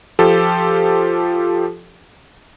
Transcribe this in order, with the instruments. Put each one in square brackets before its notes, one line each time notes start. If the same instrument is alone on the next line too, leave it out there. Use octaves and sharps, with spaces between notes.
[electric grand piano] F3 F4 G4 A4